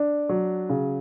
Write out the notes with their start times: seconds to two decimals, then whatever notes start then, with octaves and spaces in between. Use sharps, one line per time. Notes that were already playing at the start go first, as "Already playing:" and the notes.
Already playing: D4
0.29 F#3
0.69 C#3